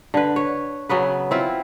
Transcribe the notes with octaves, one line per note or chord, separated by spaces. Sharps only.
D3 B4
C#5
C#3 F#3 B3 B4
C4 E4 F4